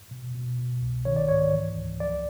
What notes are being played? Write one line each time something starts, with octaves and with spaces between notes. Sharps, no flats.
B2
B2
B2
C2
D#3 C#5
D5
G#2 C#5
E3
C#2
F3 D5